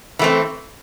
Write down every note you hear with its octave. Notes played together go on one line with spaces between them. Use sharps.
E3 A3 C4